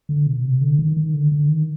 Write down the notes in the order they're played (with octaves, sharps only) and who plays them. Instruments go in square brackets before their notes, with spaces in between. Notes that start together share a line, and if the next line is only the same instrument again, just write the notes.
[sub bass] D3
B2
C3
D3
D#3
D#3
D3
D3
D#3